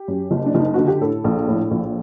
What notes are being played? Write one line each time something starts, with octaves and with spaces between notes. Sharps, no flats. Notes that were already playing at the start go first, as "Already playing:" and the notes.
Already playing: G4
F#2
F#1
D4
F#1
D#4
D3 F#4
G4
A2 A4
A#1
A2
A#1